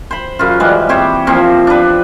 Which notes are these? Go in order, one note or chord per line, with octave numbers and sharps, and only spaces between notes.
C5 B5
F#2 C#3 F4
E3 G3 G#3
C4 G4 C5 C#5
F3 A#3 C4
D4 B4